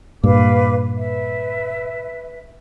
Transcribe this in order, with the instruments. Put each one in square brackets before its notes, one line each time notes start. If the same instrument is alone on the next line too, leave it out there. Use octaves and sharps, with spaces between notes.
[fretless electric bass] G2 A#2 [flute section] B4 F5 D6
[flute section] B4 E5